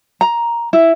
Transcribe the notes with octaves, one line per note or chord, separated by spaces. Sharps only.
A#5
E4